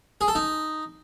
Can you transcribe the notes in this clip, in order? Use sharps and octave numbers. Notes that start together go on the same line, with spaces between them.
G#4
A4
D#4